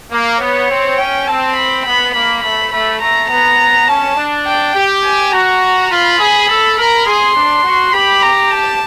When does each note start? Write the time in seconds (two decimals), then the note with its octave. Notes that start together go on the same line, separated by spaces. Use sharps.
0.12 A#3
0.40 B3 C#5
0.69 C4
0.98 C#4 G5
1.27 C4 A5
1.56 B5
1.85 B3 B5
2.14 A#3 B5
2.42 A3 B5
2.72 A3 B5
3.01 A3 A#5
3.29 B3 A#5
3.88 C#4 A5
4.16 D4
4.46 G5
4.75 G4
5.03 G#5
5.32 F#4 A#5
5.90 F4 B5
6.19 G#4
6.48 A4
6.77 A#4 B5
7.06 G#4 C6
7.35 D4
7.64 F#4
7.93 G4 B5
8.22 A#5
8.51 A5